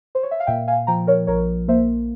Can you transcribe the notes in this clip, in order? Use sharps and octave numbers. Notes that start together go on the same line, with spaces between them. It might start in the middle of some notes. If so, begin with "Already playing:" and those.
C5
C#5
E5
F5
A#2 E5 G5
F5 G#5
F3 G5 A#5
A#4 C#5
A#1 A#4 C#5
A#3 C5 E5